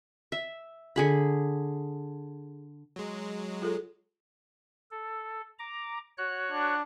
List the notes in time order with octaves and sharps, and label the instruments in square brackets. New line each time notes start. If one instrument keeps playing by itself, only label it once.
[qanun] E5
D3 G#4 B5
[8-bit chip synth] F#3 G#3
[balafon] F4 G#4 A4
[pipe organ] A4
A#5 D6
F#4 C#5 F#6
[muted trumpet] D4